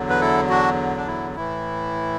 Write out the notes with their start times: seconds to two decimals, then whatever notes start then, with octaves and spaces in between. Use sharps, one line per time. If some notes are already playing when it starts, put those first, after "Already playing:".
Already playing: E2 D3 F#3
0.10 B4
0.21 E4 A4
0.50 D4 F#4
0.96 D4
1.07 E4
1.36 A2 E3 E4